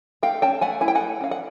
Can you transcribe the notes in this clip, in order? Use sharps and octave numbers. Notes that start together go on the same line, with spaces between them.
A3 F5 G5
C#4 G5 A5
A3 F#5 G#5
E4 G#5
G5
F#5 G#5
A3
C#4 F5
F#5